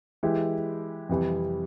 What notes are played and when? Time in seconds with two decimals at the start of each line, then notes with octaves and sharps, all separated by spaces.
0.23 E3 G#3 E4 G4
1.09 F2 C3 E3 G3